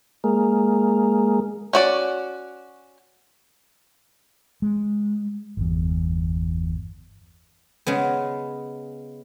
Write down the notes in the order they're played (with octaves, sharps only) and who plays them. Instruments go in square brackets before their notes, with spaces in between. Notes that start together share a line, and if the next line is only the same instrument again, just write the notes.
[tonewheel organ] G#3 A#3
[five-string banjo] C#4 F#4 D5
[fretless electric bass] G#3
G1 E2
[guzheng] C#3 G#3 B3